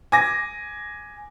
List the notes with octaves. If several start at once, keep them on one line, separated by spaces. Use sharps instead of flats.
G#5 D6 A#6